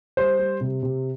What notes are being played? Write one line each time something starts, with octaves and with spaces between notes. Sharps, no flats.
G3 C5
G3
C3
C3